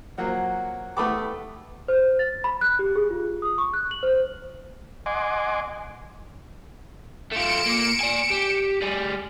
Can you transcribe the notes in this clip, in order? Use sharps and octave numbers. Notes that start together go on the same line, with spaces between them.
F3 F#3 A#3 F#5
A3 B3 G4 A5 B5 D6
C5
A6
B5
F#6
G4
G#4
F4
D#6
C#6
F#6
F#7
C5
D#5 F#5 G#5 C6 D6
A3 F4 C#7 D7 E7
A#2 A#3
D5 G#5
G4
G3 G#4